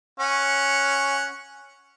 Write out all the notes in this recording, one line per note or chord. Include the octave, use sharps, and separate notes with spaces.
C#4 F#5